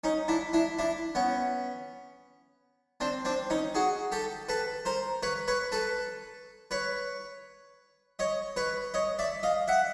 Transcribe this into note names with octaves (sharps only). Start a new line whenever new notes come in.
C#4 D#4
D4 E4
D4 E4
D4 E4
B3 C#4
C4 D4
C4 D4
C#4 D#4
F#4 G#4
G4 A4
A4 B4
A#4 C5
B4 C#5
B4 C#5
A4 B4
B4 C#5
C#5 D#5
B4 C#5
C#5 D#5
D5 E5
D#5 F5
E5 F#5